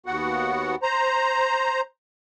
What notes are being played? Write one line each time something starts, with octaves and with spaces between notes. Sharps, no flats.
D#2 B3 F#4 F#5
C5 A#5